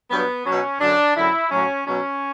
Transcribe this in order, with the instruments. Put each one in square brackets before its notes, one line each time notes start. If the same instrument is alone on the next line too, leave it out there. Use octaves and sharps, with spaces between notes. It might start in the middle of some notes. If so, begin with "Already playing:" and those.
[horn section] G2 F#3 B3
B2 F#3 C#4
F#2 D3 F#3 D4
F#2 D3 F#3 E4
A2 F#3 C#4
B2 F#3 C#4